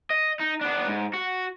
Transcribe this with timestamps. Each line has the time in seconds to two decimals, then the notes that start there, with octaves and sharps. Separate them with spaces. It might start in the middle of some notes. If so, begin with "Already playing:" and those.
0.10 D#5
0.40 D#4
0.61 B3 D4
0.87 G#2
1.13 F#4